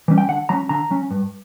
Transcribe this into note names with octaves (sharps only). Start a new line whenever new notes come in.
E3 G3 C#4
G5
D3 F#5
F#3 C#4 A#5
D3 A#5
F#3 C#4
G2